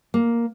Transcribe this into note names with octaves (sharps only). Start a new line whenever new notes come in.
A#3